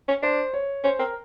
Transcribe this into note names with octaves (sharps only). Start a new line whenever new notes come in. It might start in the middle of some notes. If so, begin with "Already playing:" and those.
C#4
D4 C5
C#5
C#4 C5
C4 A#4